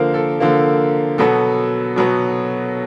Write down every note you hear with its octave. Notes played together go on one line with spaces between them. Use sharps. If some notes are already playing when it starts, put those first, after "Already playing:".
Already playing: D3 F3 A#3 A#4 C5
A4
D3 F3 A#3
B2 F#3 B3 A4
B2 F#3 B3